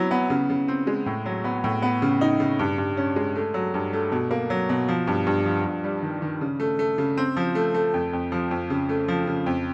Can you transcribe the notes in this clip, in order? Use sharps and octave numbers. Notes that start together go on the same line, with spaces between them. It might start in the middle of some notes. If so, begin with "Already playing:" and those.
Already playing: F#3 B3 E4
B3
C#3
C#3
C4
G#3
A2
F#3
B3
A2
B3
C#3
D#4
C#3
G2
G2
C#4
G#3
A3
F#3
G2
A3
B2
A#3
F#3
B2
F3
G2
G2
F3
G2
G3
D#3
D#3
C#3
A3
A3
C#3
C4
F3
A3
A3
F2
F2
F3
F2
C#3
A3
F3
C#3
F2